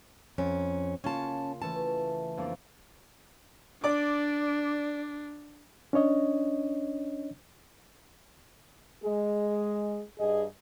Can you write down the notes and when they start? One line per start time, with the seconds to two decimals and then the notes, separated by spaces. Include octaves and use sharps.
0.38 F2 C#4
1.04 C#3 A#3 C#4 F4 A5
1.62 E3 A3 C#4 A5
2.37 F2 A#3 D4
3.84 D4 D5 D6
5.93 C#4 D4 C#5 D#5
9.03 G#3 G#4
10.19 G2 G#4 D#5